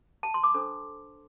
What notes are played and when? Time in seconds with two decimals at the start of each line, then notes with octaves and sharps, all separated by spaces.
0.23 A5
0.34 C6
0.44 D6
0.54 D4 A4 C5